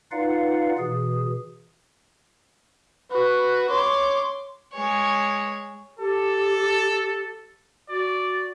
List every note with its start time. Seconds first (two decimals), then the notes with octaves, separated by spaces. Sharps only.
0.11 D#4 F4 B4 D5 F5 F#5
0.79 B2 E3 G#4
3.12 F#4 B4
3.70 C#5 C6 D6
4.74 G#3 C#5
5.99 G4 A4
7.90 F#4 D5